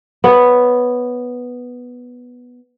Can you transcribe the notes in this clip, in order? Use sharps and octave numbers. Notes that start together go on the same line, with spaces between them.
B3 C#5